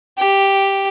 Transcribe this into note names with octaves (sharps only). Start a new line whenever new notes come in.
G4